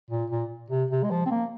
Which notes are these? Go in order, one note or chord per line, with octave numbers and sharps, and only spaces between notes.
A#2
A#2
C3
C3
G#3
F3
C4
A#3